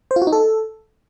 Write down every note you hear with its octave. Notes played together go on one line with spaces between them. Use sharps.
C5
F4
F#4
D#4
A4